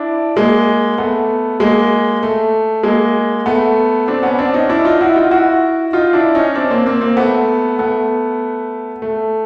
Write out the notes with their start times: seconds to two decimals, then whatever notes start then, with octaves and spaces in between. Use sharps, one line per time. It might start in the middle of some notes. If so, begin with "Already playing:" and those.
Already playing: D4 E4
0.36 G#3 A#3
0.98 A3 B3
1.60 G#3 A#3
2.23 A3
2.83 G#3 A#3
3.46 A3 B3
4.08 C4 D4
4.23 B3 C#4
4.39 C4 D4
4.53 C#4 D#4
4.70 D4 E4
4.85 D#4 F4
5.01 E4 F#4
5.16 D#4 F4
5.31 E4 F#4
5.93 D#4 F4
6.13 D4 E4
6.35 C#4 D#4
6.55 C4 D4
6.70 A#3 C4
6.86 A#3 C4
7.01 A#3 C4
7.17 A3 B3
7.79 A3 B3
9.02 A3